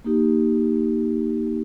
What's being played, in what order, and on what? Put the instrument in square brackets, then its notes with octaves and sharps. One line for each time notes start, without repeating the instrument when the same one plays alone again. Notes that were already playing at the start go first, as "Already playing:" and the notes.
[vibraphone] A#3 D#4 G4